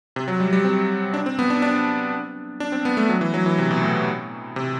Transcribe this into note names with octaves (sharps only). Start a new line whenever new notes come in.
C3
F#3
G3
G3
C4
D4
C4
B3
D4
D4
D4
C4
B3
A3
F#3
E3
F#3
E3
C3
B2
A2
C3